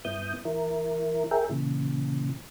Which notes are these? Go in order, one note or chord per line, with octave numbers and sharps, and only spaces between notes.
G2 B3 E4 D#6 G6
E3 E4 A#4
G#4 A#4 E5 G5
A#2 C#3 E3